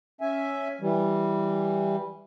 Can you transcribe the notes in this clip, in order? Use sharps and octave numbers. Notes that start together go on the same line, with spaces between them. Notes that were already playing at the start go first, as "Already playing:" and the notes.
C#4 E5 G#5
E3 G3